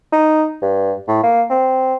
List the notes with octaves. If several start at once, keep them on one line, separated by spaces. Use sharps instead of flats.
D#4
G2
A2
A#3
C4